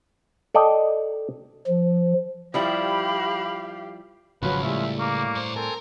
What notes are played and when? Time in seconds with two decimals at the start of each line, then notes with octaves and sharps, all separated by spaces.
0.54 A4 D5 D#5 G5
1.67 F3
2.54 F3 G3 E4 G4 F5 B5
4.42 G#1 C#2 C#3 F3 F#3 B4
4.63 A2 G3 E5
4.99 A#3 C#6 D6
5.35 G2 C5
5.56 C4 A4 A#4 G#5